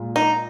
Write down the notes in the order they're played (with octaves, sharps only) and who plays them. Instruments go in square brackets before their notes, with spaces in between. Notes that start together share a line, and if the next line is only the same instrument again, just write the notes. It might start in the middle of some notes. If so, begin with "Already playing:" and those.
Already playing: [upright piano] A#2 G#3 F4
[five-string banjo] D#4